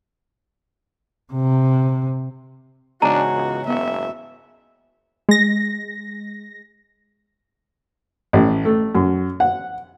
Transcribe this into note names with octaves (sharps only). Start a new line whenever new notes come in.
C3
E2 G#2 C#3 D4 F#4 A#5
C#2
F#1 B3 F#4 E5
G#3 A#6
A1
A3
F#2
F#5